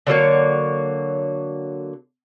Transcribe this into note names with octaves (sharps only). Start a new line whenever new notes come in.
D3 F#3 A#3 C#5